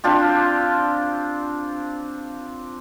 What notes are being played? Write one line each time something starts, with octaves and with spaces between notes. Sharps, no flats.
C4 D4 F4 G4